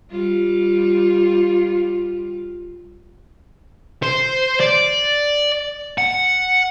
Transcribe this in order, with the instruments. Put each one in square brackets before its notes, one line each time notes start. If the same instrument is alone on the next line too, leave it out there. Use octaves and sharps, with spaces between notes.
[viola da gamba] G3 F4
[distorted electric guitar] C5
D5
F#5